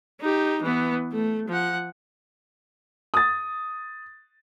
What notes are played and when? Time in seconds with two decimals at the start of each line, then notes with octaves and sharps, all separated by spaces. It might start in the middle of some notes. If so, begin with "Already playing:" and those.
0.20 D#4 G4
0.62 E3 B3
1.12 A3
1.48 F3 F#5
3.14 D#6 A6